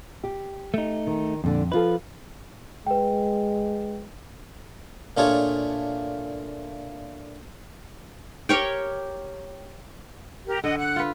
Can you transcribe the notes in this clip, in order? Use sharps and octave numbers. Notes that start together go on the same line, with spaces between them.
G4
A3 D#4
D#3
F2 A#2 D3 D4
F3 E4 F4 A4 B4
G#3 B4 G5
A#2 A3 D4 F4 G#4 C#5
G4 A#4 C#5 G5
G4 A#4
D3 D#5 F#5
F#5 F#6
F4 B4